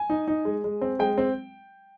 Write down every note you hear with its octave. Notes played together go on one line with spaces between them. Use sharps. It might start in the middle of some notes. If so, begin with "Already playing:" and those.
Already playing: G#5
D#4
D#4
G#3
G#3
C4
G#3 G5
C4